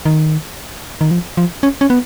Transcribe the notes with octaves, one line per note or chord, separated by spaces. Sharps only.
D#3
D#3
F3
F3
C#4
C#4
B3